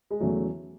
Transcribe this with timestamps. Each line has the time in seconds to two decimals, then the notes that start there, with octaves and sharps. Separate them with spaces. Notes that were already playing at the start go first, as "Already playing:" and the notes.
0.10 G#3
0.20 E2 C#3 F#3 A3